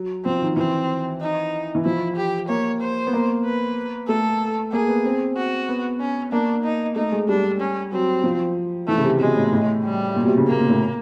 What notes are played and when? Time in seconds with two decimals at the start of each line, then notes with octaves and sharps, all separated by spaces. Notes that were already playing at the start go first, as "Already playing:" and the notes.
Already playing: F#3
0.25 F3 C4
0.42 D#3
0.56 E3 C4
1.21 D#4
1.75 E3
1.85 F3 E4
2.17 G4
2.49 A#3 C#5
2.81 C5
3.07 B3
3.13 A#3
3.45 B4
4.08 A3 A4
4.72 A#3 G#4
4.88 B3
5.05 C4
5.37 F#4
5.69 B3
6.00 C#4
6.32 A#3 D4
6.64 D#4
6.96 A3 D#4
7.12 G#3
7.29 G3 D4
7.60 C#4
7.92 F#3 C4
8.24 F3
8.88 E3 A3
8.98 C#3
9.03 C3
9.19 B2 G#3
9.37 A2
9.53 A2
9.84 G3
10.16 A#2
10.22 B2
10.27 C3
10.38 C#3
10.47 B2 A#3
10.58 A#2
10.69 A2